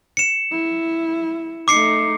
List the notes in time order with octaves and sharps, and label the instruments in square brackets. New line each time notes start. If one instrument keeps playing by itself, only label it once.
[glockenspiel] C#7 E7
[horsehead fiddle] E4
[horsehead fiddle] A3 D#4 [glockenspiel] D6 C7 C#7